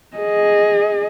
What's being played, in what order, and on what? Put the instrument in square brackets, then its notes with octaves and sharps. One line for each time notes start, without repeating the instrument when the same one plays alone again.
[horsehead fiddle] G#4 D#5